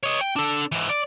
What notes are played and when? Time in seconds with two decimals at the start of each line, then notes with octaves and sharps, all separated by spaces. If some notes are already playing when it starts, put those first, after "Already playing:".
0.03 C#5 D#5
0.21 G5
0.36 D4 A4
0.72 G#2 E3
0.90 D5